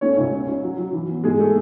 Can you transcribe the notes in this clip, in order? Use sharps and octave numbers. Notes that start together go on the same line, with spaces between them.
A3 C#4 C#5
C#2 C#4 C#5
C#4
C#4
F#3
F#3
E3
B3
G#2 G#3 G#4
A3 A4